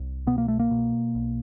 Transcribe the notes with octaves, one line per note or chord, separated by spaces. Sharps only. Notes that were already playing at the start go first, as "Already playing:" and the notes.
Already playing: C2
B2 B3
A#3
A3
A#3
B2
B1